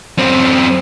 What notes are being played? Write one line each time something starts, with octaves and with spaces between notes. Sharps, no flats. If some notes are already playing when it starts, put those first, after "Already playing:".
F#2 C4